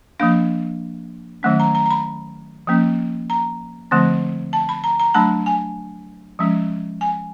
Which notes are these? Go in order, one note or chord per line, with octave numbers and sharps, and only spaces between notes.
F3 A#3 D4 F5
D#3 F#3 A3 C#4
A#5
A#5
A#5
B5
F3 A#3 C#4
A#5
D3 F3 A3 C4
A5
B5
A#5
A#5
F#3 A3 D4 A5
G#5
F3 G#3 C#4
G#5